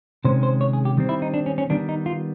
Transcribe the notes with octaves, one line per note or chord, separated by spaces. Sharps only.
C3 D#3 G#3 C#4 C5
C5
C#5
G#4
G4
D#3 G3 C4
E4
D#4
D4
C#4
C#4
D#3 G3 B3 D4
D#4
F4